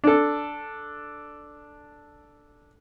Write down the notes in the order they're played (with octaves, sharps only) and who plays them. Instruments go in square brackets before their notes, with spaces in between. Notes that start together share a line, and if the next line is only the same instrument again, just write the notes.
[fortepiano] D4 A4